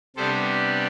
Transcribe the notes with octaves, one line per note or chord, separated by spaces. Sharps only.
C3 G3 B3 D4 A4 C5